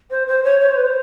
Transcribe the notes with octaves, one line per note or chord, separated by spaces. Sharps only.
C5
C5
C#5
C#5
C5
B4
C5